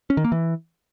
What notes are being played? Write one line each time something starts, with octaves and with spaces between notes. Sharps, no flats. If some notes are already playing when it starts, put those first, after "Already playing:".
C#4
D#3
A#3
E3